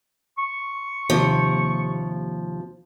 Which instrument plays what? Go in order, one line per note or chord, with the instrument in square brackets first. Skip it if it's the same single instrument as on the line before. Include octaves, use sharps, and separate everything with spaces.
[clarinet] C#6
[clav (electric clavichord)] D#2 C3 [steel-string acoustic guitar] F3